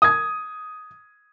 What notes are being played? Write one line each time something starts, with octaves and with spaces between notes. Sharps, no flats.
D#6 G#6